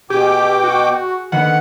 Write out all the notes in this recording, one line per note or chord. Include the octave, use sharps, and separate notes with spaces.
B2 G4 G#4 G5 D6
F#4
D3 D#3 A#3 B4 F#5